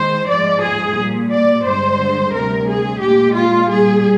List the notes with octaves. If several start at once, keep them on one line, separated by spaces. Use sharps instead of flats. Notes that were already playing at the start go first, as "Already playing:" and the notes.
Already playing: D#3 G#3 C5
G#2 F3 G#3 D5
G#4
A#2 G3
D5
G2 D3 G#3 C5
D2 C3 G3 A#4
G#4
A#2 G4
G#3
F4
A#2 G3 G#4